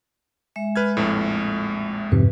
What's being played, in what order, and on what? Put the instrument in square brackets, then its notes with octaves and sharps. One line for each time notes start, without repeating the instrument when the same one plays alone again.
[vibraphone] G#3 E5
[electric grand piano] B4 F6 G#6
A#1 F2 A2
[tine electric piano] F2 G#2 C3 [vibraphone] B4